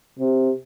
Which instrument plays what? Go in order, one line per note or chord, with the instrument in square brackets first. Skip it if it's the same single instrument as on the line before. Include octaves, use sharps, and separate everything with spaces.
[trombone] C3